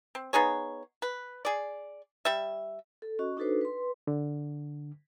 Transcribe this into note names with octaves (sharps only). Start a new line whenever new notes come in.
C4
B3 D#4 G#4 C#5
B4
G#4 D5
G3 E5
A4
C#4 F#4 D#5
D4 D#4 F#4 A4 B4 C5
B4 C6
D3